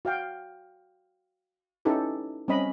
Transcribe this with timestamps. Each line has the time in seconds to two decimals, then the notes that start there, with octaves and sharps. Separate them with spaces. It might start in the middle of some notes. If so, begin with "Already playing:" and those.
0.05 F#4 F5 G5
1.85 C#4 D#4 E4 G4 A4 B4
2.48 G3 C4 C#4 D#5 B5